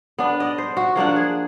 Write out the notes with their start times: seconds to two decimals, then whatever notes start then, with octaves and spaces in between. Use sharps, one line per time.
0.19 B3 D4
0.40 D5 D#5
0.58 C5
0.77 F#4
0.96 F3 A#3 D4 F#5
1.16 G#4